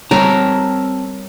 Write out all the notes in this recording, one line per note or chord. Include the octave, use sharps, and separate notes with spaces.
G3 C4 A#4 C#5 A5 A#5